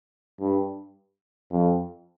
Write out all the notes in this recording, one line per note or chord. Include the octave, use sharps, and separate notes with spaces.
G2
F2